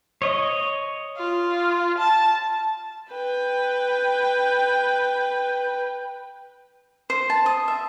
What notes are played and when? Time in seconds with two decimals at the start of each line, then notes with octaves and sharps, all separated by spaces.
0.22 C#5 D#5
1.17 F4
1.98 A5
3.10 B4 G5
7.10 C5
7.30 A5
7.46 D#6
7.68 E5